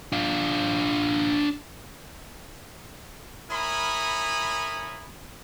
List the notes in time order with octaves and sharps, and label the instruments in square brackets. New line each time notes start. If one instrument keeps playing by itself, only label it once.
[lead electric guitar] D4 F4
[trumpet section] E4 A#4 C#5 G#5 B5 D#6